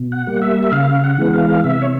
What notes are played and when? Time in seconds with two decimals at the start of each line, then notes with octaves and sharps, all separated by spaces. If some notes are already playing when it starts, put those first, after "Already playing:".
Already playing: B2
0.12 F#5
0.27 G3 A#3
0.42 E5
0.63 E5
0.72 C#3 F5
1.04 F#5
1.18 E3 G#3 B3
1.33 F5
1.64 C3 E5
1.82 C#5